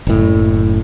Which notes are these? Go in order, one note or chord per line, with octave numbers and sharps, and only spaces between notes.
F#1 A2